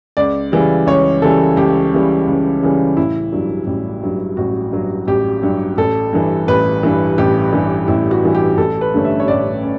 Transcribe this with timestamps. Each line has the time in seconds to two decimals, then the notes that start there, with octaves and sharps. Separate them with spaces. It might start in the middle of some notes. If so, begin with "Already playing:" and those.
0.17 C#2 D5
0.52 C#3 E3 G3
0.87 C#2 C#5
1.22 C#3 E3 G3 A4
1.56 C#2 G4
1.93 C#3 E3 G3
2.27 C#2
2.63 C#3 E3 G3
2.97 A1 E4
3.32 G2 F#3
3.67 A1
4.03 G2 F#3
4.37 A1 F#4
4.72 G2 F#3
5.07 A1 G4
5.42 G2 F#3
5.78 A1 A4
6.13 G2 E3
6.48 A1 B4
6.83 G2 E3
7.18 A1 G4
7.53 G2 E3
7.88 A1 E4
8.11 F#4
8.23 G2 E3
8.35 G4
8.58 A1 A4
8.81 B4
8.94 G2 D3 A3 C#4
9.04 E5
9.20 C#5
9.28 A1 D5
9.63 C#4